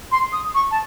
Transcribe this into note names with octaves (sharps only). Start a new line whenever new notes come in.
C6
D#6
C#6
A5